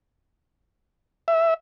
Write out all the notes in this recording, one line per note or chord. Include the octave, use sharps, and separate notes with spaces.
E5